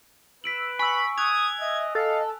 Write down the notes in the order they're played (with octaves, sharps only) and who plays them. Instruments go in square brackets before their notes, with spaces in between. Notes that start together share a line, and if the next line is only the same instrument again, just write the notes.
[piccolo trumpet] B4 [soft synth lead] E6 [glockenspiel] B6 D7 F#7
[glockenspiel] G#5 E6 [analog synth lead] B5 [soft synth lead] C#6
[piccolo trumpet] D#6 [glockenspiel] F#6 F7 [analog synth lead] G#6
[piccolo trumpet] D#5 [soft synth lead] E5
[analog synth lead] A4 [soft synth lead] D#5 [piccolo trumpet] F5